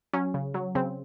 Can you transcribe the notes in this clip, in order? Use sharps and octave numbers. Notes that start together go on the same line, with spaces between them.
F#3 C#4
C#3
F#3
C#3 C4